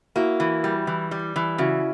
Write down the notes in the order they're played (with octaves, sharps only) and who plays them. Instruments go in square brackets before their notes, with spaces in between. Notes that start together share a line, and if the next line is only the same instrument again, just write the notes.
[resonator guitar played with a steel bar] A#3 [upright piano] E4 F#4
[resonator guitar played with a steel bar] E3
G3
E3
G3
E3
[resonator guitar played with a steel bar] C#3 [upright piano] E4 F#4